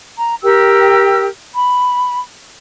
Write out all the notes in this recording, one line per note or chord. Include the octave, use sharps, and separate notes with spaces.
A#5
G4 A#4 G5 E6
B5